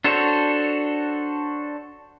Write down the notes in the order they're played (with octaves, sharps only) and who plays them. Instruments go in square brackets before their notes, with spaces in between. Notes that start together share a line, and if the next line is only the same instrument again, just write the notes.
[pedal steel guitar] D4 F#4 A4 C5 C#5